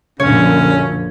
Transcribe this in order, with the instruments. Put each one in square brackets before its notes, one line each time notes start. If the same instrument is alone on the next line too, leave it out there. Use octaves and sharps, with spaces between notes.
[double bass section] A#1 F#2 D3 [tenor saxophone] C#4 [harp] C#5